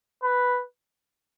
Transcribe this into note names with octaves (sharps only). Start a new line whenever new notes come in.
B4